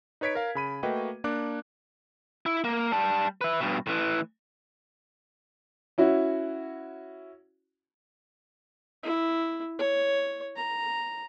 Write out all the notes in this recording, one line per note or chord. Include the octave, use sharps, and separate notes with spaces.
D#4 B4 C#5 G#6 B6 D7
A#4 F5
C#3 B5 D#7
A3 A#3 F#4 B4 D#5 G5
A#3 D4 D6 F#6
E4
A#3
G3 A5
B4 E5
G2 B2
A2 E3
C#4 E4 F#4
E4
C#5
A#5